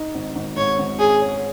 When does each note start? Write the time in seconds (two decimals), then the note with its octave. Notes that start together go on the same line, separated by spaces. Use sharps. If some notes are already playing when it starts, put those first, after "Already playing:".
Already playing: D#4
0.15 G#1
0.35 G#1
0.56 G#2 C#5
0.79 G#1
0.99 C#4 G#4
1.21 C#4